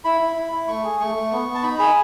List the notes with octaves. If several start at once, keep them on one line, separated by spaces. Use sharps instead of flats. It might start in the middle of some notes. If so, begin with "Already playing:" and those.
E4 B5
E4
E4
E4
A3 C#6
G#4
A3 C#6
A3
B3
B3
A5
D#4 B5
G#4 B5